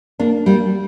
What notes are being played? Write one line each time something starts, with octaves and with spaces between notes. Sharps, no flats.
A#3 D4
G3 A#3